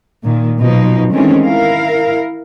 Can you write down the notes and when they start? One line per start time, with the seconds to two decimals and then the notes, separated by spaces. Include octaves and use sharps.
0.24 A#2 D#3
0.59 B2 F3 F#3 D#4
1.13 D#3 E3 G#3 A3 C4 C#4
1.44 E4 A#4 F5